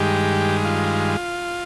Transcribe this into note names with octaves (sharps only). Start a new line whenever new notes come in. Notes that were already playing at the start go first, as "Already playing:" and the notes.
Already playing: G2 D#3 G#3 G4
F4